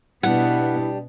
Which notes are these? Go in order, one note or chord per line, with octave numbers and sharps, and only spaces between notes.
B2 G3 B3 D4 E4 F#5